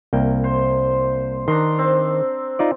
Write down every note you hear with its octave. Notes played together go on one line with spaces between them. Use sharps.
C2 A#3 G5
C5
D#3 D4 A#5 C6
C4
D#4 F4 D5